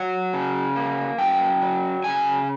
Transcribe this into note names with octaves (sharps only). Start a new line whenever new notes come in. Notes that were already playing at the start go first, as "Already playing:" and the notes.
Already playing: F#3 F#5
C#3
A#3
F#2 G5
F#3
C#3 G#5